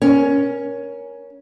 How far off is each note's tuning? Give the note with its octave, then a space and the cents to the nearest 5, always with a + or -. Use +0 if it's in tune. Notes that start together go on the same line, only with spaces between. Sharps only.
C#4 +5 A#4 +25